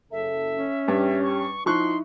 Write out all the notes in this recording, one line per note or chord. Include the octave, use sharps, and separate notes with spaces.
F#1 C#3 A4 E5
C#4
G2 G4
C#6
F3 D#4 E4 C6 C#6 F#6